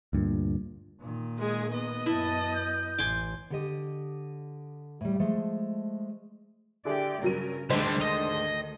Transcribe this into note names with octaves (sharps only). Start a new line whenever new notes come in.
D2 G2 A#2
A#2 D#3
G#3 G#4
B3 D#5
F#2 E4 A5
G6
A1 G#5 C6 D6
D3 G4 D#5
A2 G3
F3 G#3 A3
D3 E4 G4 G#4 D5
G2 C#3 F#3 A#4 D#7
D2 G#2 D3 D#3 G3 D4 C5
D#5